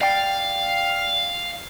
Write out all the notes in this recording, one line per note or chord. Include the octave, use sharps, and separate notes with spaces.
D5 F5 G5